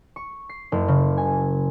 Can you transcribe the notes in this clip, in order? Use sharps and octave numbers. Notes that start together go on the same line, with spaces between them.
C#6
C7
F#1
C#3
G#5